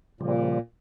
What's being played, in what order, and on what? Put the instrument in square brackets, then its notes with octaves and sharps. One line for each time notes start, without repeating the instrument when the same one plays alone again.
[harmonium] A#2 [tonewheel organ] C#3 F3 G3